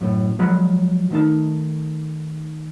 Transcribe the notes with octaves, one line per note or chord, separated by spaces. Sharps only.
F#2 A2
F3 F#3 G#3 F#5 A#5 B5
D#3 A3 C4 D#4 A5